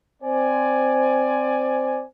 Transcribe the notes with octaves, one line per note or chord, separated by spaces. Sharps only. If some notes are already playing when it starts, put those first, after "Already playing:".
C4 C5 D5 G#5